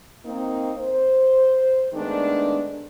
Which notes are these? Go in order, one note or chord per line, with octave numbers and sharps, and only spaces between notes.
A#3 C4 D#4
C5
D#3 G#3 A3 B3 D4